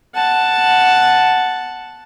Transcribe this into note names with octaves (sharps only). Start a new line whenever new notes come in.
F#5 A5